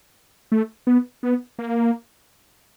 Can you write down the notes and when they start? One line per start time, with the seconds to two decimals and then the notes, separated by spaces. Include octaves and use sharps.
0.52 A3
0.87 B3
1.23 B3
1.59 A#3